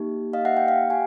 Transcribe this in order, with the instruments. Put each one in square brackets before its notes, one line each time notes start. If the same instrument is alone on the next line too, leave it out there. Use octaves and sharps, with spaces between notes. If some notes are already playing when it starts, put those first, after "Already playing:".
Already playing: [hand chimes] A#3 D#4 G4
D#5 F5
E5 F#5
F5 G5
F5 G5
G4 F#5 G#5